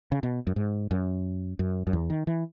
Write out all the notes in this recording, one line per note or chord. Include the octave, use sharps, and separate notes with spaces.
C#3
B2
F#2
G#2
F#2
F#2
F#2
E2
D#3
E3